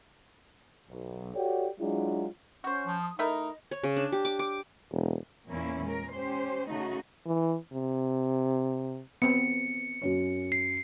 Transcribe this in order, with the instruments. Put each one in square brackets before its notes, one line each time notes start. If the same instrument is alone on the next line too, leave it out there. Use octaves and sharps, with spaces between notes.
[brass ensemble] B1
F#4 G4 A4 C#5 D5 G5
F#3 G#3 D4 E4 F4 G#4
[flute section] C#4 C#6 G6 [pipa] F#4 C5
[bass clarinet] F3
[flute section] D#6
[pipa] A3 E4 A#4 [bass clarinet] D#4 [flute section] D#5
[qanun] C#5
C#3
D4
G4
D6
D6
[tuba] E1
[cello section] E2 A#2 A#3 C#4 E4
G#3 A#4
C#4 G4 C5
C#3 A3 D#4 F#4
[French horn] E3
C3
[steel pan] B3 C4 [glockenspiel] C#7
[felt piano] F#2 C#4 C#5
[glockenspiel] C7